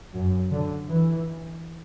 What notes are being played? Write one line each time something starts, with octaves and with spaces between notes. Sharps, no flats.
F#2
D3
E3